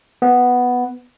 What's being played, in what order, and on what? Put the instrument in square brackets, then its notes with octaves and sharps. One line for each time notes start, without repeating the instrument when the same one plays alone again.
[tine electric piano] B3